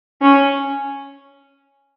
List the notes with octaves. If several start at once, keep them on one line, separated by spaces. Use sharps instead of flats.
C#4